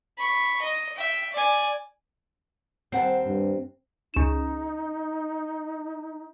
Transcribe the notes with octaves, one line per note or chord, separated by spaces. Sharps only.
B5 C#6
D#5
E5 G5
D5 G#5
D#2 C4 F#5 A5
G2
C#2 D#4 E7